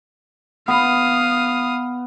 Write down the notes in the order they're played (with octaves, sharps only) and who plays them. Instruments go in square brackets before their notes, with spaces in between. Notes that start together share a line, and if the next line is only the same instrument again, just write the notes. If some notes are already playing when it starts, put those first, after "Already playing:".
[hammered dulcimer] B3 [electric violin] F5 D#6